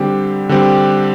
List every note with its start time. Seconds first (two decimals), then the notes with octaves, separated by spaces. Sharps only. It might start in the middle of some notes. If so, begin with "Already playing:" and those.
Already playing: D3 G3 C4 G4
0.49 D3 G3 C4 G4